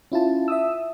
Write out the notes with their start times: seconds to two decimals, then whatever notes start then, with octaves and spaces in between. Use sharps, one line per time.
0.12 C#4 E4 F4 A5
0.48 E5 D#6 E6